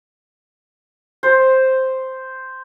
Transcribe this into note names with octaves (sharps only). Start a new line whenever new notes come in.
C5